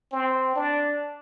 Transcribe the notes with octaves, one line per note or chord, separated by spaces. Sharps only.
C4
D4